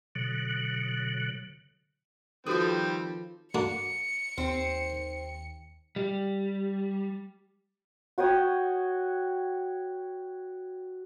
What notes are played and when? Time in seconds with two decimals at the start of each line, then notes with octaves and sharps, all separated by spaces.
0.15 B2 D3 F#3
2.46 D#3 F3 G3 C4 F#4 A4 B4 D#6
3.55 A#3 D4 F#4 C#7
4.38 D#2 C4
5.96 G3
8.18 F#4 C#5 G5 D#6